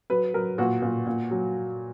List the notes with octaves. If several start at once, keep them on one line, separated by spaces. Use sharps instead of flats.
F#3 B4
F#3 A#4
A#2 F#4
A#2
A#2
F#3